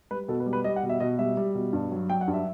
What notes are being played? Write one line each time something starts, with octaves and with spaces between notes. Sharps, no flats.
G3 B4
B2 A4
B4
G3
B4
G3 D#5
F#5
B2
E5
B2 D#5
G3 E5
G3
B2
G2
F#3
F#3 G5
F#5
G2
E5